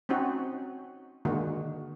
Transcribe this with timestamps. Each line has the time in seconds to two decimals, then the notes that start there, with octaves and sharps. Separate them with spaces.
0.09 C4 C#4 D#4 F#4
1.25 D3 D#3 G#3 A#3 F#4